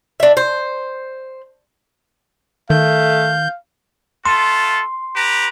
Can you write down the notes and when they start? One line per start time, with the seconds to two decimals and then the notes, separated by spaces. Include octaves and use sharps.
0.20 D4 E5
0.37 C5
2.70 D#3 A3 F5 G6
4.26 A3 F4 A4 C6
5.16 G4 B4 A#5